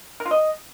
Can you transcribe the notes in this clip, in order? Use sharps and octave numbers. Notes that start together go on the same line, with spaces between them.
A#4
F4
D#5